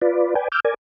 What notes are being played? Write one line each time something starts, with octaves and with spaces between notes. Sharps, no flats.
F4 B4 D5
B4 D5 G5 G#5
D6 E6 F6 G6
A#4 D5 G#5